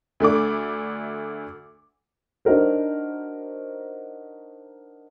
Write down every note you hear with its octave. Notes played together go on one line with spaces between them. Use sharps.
D2 A3 D4 D6
D4 D#4 F#4 A#4 C5